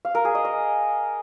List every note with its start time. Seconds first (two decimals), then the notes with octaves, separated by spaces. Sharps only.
0.05 F5
0.15 A#4
0.25 G#4
0.35 D#5
0.45 D#5